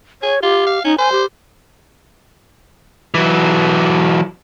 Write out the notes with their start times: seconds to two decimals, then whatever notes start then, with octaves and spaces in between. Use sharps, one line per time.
0.22 G#4 C#5
0.42 F4 G4
0.67 F5
0.84 C#4 D#4
0.98 C5 G#5
1.12 G4
3.14 E3 F#3